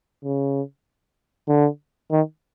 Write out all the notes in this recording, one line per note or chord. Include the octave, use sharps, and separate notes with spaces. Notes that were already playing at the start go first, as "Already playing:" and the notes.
C#3
D3
D#3